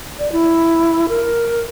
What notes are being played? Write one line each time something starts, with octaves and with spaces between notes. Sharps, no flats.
D5
E4
A#4